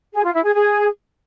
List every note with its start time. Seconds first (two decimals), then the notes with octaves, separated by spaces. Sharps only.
0.13 G#4
0.23 F4
0.33 E4
0.44 G#4
0.54 G#4